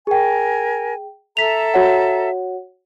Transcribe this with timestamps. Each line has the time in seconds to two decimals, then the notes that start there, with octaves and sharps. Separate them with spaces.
0.07 G#4 A#4 G5 G#5
1.37 A4 E5 A#5 B6 F7
1.74 F#4 C#5 F#5